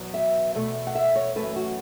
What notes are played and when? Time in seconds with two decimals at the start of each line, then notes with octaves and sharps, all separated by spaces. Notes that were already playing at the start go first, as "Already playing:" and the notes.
Already playing: E2 B2 F#3 B3
0.14 E5
0.55 E2 B2 A3
0.87 F#5
0.95 E5
1.16 C#5
1.36 F#2 E3 A3 B4
1.56 F#4